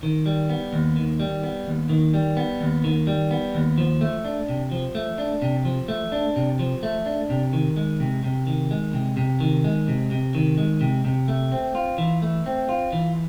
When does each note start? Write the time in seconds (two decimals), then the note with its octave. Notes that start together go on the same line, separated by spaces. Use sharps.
0.03 D#3
0.26 G3
0.50 B3
0.73 D#2
0.96 D#3
1.20 G3
1.43 B3
1.67 D#2
1.89 D#3
2.14 G3
2.37 B3
2.61 D#2
2.84 D#3
3.07 G3
3.31 B3
3.54 D#2
3.78 F3
4.01 A3
4.25 D4
4.49 C3
4.71 F3
4.95 A3
5.18 D4
5.42 C3
5.65 F3
5.88 A3
6.12 D4
6.36 C3
6.59 F3
6.83 A3
7.06 D4
7.30 C3
7.53 D#3
7.77 G#3
8.00 C3
8.24 C3
8.47 D#3
8.71 G#3
8.93 C3
9.17 C3
9.40 D#3
9.64 G#3
9.88 C3
10.11 C3
10.35 D#3
10.58 G#3
10.81 C3
11.05 C3
11.28 A3
11.52 C4
11.75 F4
11.98 E3
12.22 A3
12.46 C4
12.69 F4
12.93 E3